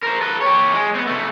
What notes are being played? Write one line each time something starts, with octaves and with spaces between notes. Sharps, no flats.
A#4 C5
A4 B4
G4 C#5
G#3
B3 C4
C3 A3